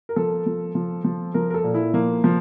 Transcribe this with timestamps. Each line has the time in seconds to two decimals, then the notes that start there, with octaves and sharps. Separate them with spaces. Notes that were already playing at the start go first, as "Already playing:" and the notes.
0.09 A#4
0.16 F3 A4
0.46 F3
0.75 F3
1.04 F3
1.34 F3 A#4
1.50 A#4
1.54 A4
1.64 A#2
1.74 E4
1.94 F3 A#3
2.24 F3